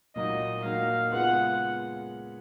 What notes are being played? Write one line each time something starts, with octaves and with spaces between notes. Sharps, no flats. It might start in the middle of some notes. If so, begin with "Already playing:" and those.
A#2 F#3 A#3 D#4 F#4 D#5
A#2 F#3 A#3 D#4 F#4 F5
C#3 G#3 B3 F4 F#5